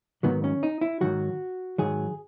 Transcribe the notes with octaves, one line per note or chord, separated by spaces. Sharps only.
G#2 D#3 F#3 B3
C#4
D#4
E4
G#2 D#3 F#3 F#4
G#2 D#3 F#3 G#4